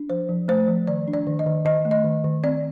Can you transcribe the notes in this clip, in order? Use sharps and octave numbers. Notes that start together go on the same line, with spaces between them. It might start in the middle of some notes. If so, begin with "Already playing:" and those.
Already playing: D4
F3 C5
F3
A3 C5
F3
D#3 D5
D4
D5
D#3
D#5
D#3
D#3 D#5
A3
D#5
D#3
D#3
C4 D5